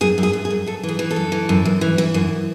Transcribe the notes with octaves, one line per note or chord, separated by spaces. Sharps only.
F#2 G#4
F#2
G#4
F#2
G#4
F#2
F#2 A4
E3
G#4
E3
A4
F#2
E3
F#2
F#2
E3
E3
F#2